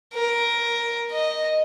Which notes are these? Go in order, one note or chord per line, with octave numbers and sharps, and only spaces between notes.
A#4
D#5